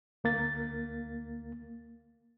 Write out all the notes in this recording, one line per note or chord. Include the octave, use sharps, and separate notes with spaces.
D2 A#3 A6